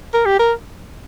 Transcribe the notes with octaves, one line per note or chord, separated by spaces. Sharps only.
A#4
G4
A#4